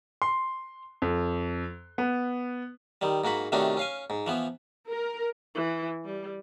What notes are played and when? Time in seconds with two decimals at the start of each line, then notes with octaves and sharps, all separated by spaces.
0.22 C6
1.02 F2
1.98 B3
3.01 D#3 G3
3.24 G#2 A#3 F#4 B5
3.52 C3 D#3 A3 C#4 D4 F#4
3.77 C#4 F5 G#5
4.10 G#2
4.27 E3 F3 B3
4.92 A#4
5.55 E3
6.05 G3